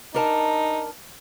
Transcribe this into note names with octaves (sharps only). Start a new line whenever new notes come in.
D4 D#4 A#4 A5